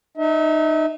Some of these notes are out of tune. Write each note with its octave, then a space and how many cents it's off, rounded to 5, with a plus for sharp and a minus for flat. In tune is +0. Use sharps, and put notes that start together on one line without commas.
D#4 -25 E5 -40